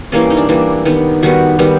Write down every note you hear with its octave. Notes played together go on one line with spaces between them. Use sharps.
E3 G3 A#3 C#4
D#4
D4
E3 G3 A#3 D4
D#3 G3 B3
D#3 G3 B3 F#4
D#3 G3 B3